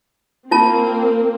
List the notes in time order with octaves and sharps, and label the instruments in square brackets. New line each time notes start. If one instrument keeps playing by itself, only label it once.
[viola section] A#3 C4 [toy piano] F4 A5